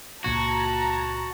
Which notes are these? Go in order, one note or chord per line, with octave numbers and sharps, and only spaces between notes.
C#2 A#2 F#4 A5 A#5 G#6